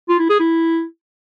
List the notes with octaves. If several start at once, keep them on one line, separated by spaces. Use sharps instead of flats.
F4
E4
G#4
E4